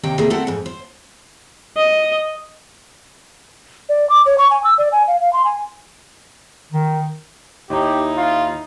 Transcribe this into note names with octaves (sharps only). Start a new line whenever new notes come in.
D#2 C3 D#4 G5
C3 A3 A#3 G#4
A3 C4 A4 A#4 F#5
F2 G#2
C5
D#5
D5
D6
C#5
C#6
G#5
E6
D5
G#5
F5
F5
C6
G#5
D#3
D#2 D#4 E4 G4
F4